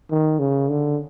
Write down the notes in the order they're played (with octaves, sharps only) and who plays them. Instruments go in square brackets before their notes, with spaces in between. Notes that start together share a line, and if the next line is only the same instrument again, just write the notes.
[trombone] D#3
C#3
D3